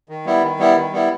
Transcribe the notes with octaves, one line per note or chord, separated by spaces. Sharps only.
D#3
G3 B3 E4
D#3
G3 B3 E4
D#3
G3 B3 E4